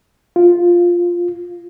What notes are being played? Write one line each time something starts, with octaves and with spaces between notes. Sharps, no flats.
F4